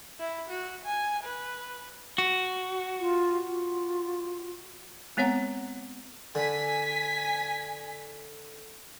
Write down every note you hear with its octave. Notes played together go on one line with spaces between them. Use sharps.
E4
F#4
G#5
B4
F#4
F4
F4
G#3 B3 C4 C#5 F#5 A#5
D3 G#5 B6